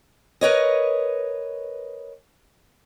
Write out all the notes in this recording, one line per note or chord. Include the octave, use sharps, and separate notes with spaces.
A#4 B4 C#5 D#5